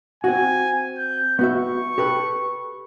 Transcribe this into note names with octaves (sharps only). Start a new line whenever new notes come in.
C4 F#4 G#5
G6
B3 F#4 E5 C#6
G4 A4 B4